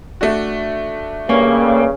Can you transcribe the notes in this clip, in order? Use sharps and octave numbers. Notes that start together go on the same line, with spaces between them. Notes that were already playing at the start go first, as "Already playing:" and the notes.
A3 D4 F#4
G2 C#3 A#3 C#4